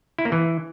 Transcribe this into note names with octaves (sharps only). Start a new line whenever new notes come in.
E4
A#3
E3